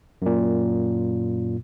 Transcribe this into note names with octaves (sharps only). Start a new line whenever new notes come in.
F#2 A#2